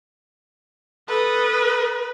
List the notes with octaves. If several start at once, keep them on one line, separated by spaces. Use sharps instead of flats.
A4 B4 D#6